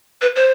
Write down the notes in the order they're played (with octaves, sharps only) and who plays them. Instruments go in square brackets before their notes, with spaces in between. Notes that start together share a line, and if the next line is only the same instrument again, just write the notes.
[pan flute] B4
C5